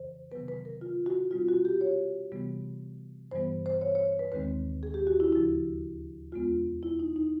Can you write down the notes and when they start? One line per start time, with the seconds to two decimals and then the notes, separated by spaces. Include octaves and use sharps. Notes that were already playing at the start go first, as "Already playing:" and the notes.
Already playing: F2 C#3 E3 C5
0.31 C3 D#3 F#3 B3 B4
0.48 B4
0.65 A#4
0.81 F4
1.06 F#4
1.31 B2 G3 C4 D#4 F4
1.48 F#4
1.65 G4
1.81 C#5
2.32 C3 E3 G3 B3
3.31 G2 E3 G3 B3 C5
3.66 C5
3.81 C#5
3.95 C#5
4.19 B4
4.32 D#2 D#3 G#3 C4 B4
4.83 G#4
4.94 G4
5.07 F#4
5.20 E4
5.32 D2 C#3 F3 E4
6.32 E2 B2 G#3 B3 D4 F4
6.83 E4
6.99 D#4
7.16 D#4